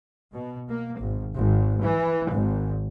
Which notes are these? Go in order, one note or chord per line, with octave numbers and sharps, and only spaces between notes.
B2
A#3
G#1
G#1
E3
G#1